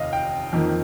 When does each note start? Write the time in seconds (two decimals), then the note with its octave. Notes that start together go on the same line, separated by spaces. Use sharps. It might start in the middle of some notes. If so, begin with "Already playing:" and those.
Already playing: F1 D#2 D#5 F5
0.13 G5
0.53 F2 D#3 A#3